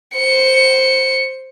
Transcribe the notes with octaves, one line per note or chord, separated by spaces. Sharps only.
C5 C#7